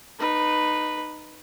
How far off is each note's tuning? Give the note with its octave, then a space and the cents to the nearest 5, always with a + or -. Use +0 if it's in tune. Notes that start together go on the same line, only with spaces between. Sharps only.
D#4 -20 B4 +0